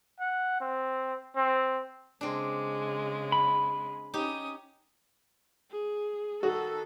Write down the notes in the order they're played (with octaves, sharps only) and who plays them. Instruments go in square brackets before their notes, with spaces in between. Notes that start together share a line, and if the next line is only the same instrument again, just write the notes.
[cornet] F#5
C4
C4
[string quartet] C#3 G#3 [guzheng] C4 D4
[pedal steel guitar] B5
[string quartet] C#4 D#6 [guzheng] D#4 G4
[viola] G#4
[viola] D#3 A4 [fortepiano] F#4